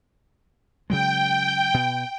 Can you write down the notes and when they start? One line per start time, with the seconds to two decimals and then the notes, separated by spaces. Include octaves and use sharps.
0.90 C#3 F#3 G#3 G5
1.74 B2